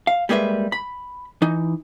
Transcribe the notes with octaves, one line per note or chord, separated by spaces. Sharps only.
F5
G3 G#3 A#3 B4 E5
B5
E3 D#4